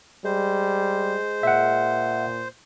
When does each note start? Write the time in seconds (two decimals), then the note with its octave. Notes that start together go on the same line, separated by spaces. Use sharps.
0.25 G3 G#3 C5
1.43 A#2 E5 F#5